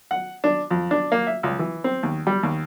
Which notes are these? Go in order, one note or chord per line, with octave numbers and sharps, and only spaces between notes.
F#5
D4
F2
D4
A#3
E5
C#2
E3
C4
D#2
G3
D#2